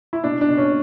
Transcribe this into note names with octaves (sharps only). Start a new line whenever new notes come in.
E4
B2 D4
D4
B2
C#4